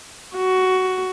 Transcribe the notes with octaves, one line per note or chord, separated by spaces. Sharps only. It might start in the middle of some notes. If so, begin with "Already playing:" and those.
F#4